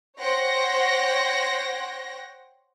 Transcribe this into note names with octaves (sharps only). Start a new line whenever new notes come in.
C5 C#5 F#5 G5 A#6